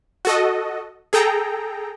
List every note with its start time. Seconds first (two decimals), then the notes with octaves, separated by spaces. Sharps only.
0.25 F#4 A4 D#5
1.13 G#4 A4 G5 A#5